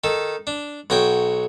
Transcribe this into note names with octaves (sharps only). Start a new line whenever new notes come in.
D#3 A4
D4
B1 F#4 C#5 G5